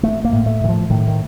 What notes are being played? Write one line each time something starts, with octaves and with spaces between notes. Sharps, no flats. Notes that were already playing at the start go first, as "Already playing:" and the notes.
A1 A3
A#3
A2
A3
A2 D#3
F3
A2 D#3
D#3